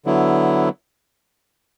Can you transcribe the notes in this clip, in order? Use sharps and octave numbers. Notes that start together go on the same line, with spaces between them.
D3 F#3 B3 E4